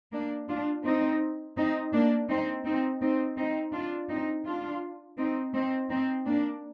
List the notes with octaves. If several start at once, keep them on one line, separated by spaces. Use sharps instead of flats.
A#3 D4
D4 F4
C4 D#4
C4 D#4
A#3 D4
C4 D#4
C4 D#4
C4 D#4
C4 D#4
D4 F4
C4 D#4
D4 F4
C4 D#4
C4 D#4
C4 D#4
A#3 D4